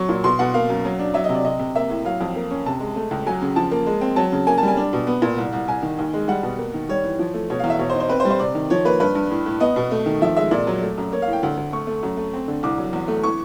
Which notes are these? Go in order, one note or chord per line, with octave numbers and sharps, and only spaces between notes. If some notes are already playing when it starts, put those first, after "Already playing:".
Already playing: F#3 C#6
A#2
B2 C6
B2 F#5
A#3 F5
F#2
F#3
D4
F#3 E5
D#5
C3
D5
C3 D#5
C3
A#3 E5
A2
F#3 F5
F2
A#3
C#4
C3 A5
G#3
A3
C#2
F#3 G#5
C#3
F3 A5
A#3
G#3
C4
F#3 A5
C#3
A#3 G#5
A5
G3
G#5
D4
B2
B3
A#2
C2
C2
C2 G#5
D#3
D#2
G#3
G3 F#5
B2
A#3
D#3
G3 C#5
E3
F3
A3
B2 C#5
F5
E2
E5
B2 C#5
C5
D#4
C5
C4 B4
C5
G3
C5
C3 D5
D#3
F3 C#5
A#3 B4
G2 B4
G2
A2
A2
B3 D#5
B2
A3
D#3
F3 E5
G#3 E5
A#2 D5
F#3
A3
F#2
A#3 C#5
F5
A2
G5
D2
D2
A3 C#6
A3
F#2
A3
C4
D3
C2 D6
F#3
E2
A3
E3 C#6